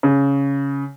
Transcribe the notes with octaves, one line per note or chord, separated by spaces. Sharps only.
C#3